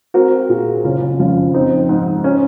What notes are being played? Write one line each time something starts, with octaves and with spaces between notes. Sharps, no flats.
C4 F#4 A#4
A#2 F4 G#4
F#1 C#4 F4
F2 C#4 F4
C4 D#4
G#2
C#4